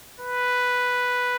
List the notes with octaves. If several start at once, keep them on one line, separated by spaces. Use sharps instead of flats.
B4